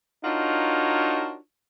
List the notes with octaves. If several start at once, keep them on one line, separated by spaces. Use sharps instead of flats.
D4 D#4 F4 F#4 A#4 C#5